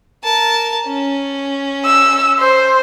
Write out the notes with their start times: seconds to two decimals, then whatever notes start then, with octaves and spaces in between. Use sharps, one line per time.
0.23 A#4 A5
0.87 C#4
1.85 E6
2.39 C5